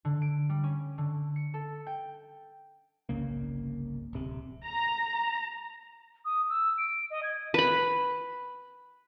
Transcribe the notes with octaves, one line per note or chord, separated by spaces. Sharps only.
D3
D7
G3
C#4
D3
C#7
A4
G5
G1 C2 C#3 A#3
D1 C3
A#5
D#6
E6
D7
D#5
G#6
B4 B5